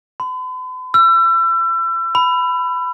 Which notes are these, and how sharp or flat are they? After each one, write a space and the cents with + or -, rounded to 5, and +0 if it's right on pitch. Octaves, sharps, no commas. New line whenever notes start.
B5 +45
E6 +35
B5 +15